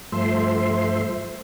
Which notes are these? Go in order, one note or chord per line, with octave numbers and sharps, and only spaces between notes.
G2 F3 A3 C5 E5 C6